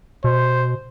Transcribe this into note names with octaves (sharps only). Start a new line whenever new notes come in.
B2 C5